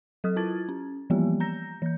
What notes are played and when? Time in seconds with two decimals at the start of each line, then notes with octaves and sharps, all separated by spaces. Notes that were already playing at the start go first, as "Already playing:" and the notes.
0.24 F#3 A4 D#6 F6
0.36 E4 F4 A5 G#6 A6
0.69 C#4
1.10 E3 F3 G3 A#3 B3 G4
1.40 A#5 G6 A#6
1.82 E3 G6